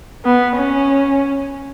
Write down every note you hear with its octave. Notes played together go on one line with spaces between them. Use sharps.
B3
C#4